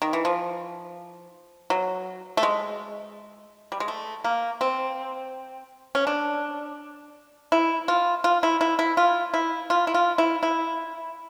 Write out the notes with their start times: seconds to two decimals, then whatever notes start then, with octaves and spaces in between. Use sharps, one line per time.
0.02 D#3
0.13 E3
0.25 F3
1.70 F#3
2.37 A3
2.43 G#3
3.72 G3
3.80 G#3
3.88 A3
4.24 A#3
4.61 C4
5.95 C#4
6.07 D4
7.52 E4
7.88 F4
8.24 F4
8.43 E4
8.61 E4
8.79 E4
8.97 F4
9.34 E4
9.70 F4
9.87 E4
9.94 F4
10.18 E4
10.43 E4